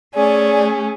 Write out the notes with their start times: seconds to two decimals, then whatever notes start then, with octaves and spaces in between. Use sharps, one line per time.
0.15 A3 C#4 G#4 D5